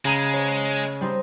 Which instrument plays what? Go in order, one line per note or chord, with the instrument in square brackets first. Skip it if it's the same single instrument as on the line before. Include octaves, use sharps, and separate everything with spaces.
[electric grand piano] C#3 A#5 D#7 [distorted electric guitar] G#3
[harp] C#5
G3 C4 D#4